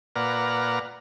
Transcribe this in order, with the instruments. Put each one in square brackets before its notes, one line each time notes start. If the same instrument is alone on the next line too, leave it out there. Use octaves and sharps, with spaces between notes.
[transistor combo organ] A#2 B4 D5 F#5 A#5 F6